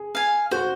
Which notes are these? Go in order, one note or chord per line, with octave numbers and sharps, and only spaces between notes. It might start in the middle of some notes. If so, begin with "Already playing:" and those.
Already playing: G#4
F5 G#5
F#4 C5